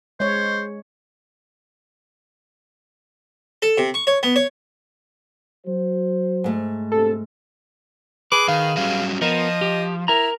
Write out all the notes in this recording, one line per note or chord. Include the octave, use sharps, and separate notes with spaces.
G#3 C5 C#5
A4
C3
C#6
C#5
B3
C#5
F#3 F#4 C5
G#2 A3
A#1 C3 A4
G#4 B4 D6
D#3 F5
F#3 G3 C#4 F5
F3 B3 F4 A#4 D#5
G4
E4 A#4 A#5